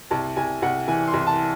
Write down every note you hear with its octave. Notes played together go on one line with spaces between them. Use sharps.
C2 A5
C2 G#5
C2 F#5
E3 G#5
C6
C2
A5